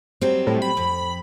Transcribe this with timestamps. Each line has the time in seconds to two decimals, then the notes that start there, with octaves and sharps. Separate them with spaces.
0.21 F#3 G3 C4
0.47 A2
0.62 B5
0.77 F2